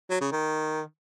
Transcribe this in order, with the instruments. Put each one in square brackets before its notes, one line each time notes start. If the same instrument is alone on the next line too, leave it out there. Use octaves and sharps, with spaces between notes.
[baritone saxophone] F#3
C#3
D#3